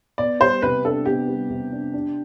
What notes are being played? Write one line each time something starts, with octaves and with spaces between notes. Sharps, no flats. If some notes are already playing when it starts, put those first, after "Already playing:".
B3 D5
G3 C5
C3 B4
D4 A4
B3 G4
G3
C3
D4
D4